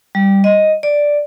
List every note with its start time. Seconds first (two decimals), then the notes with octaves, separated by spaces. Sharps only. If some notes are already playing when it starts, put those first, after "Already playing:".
0.15 G3
0.44 D#5
0.83 D5